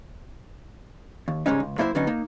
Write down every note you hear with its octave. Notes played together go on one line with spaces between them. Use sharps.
D#2
G#2 C#3 G3 G#3 C#4 D#4
C#2
F#2 A#3 E4 C5 C#5 E5
D3 F#3 B3 C#4 D#4
A#3 D#4